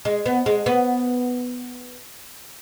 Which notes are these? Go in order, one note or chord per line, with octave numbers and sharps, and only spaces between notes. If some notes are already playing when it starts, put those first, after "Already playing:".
G#3
B3
G#3
B3